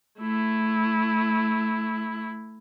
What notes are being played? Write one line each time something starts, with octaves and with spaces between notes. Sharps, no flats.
A3 E4